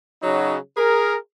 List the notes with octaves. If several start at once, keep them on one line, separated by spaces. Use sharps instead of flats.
C#3 F#3 D#4 F#4
G#4 A#4